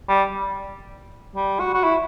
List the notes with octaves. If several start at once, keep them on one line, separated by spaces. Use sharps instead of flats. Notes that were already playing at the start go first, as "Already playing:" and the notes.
G3
G3
F#4
F#4
E4